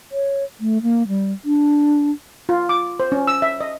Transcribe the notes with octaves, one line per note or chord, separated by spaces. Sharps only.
C#5
A3
A#3
G3
D4
F4
D6
C5
C#4
E6
E5
D#5